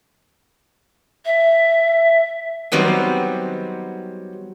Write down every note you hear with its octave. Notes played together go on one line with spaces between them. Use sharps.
E5
D#3 F#3 G3 B3 C4